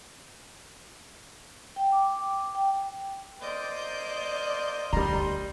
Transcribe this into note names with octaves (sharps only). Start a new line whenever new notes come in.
G5
D6
G5
A#3 C5 D5 D#5 G6
D2 C#3 G3 A#5 C6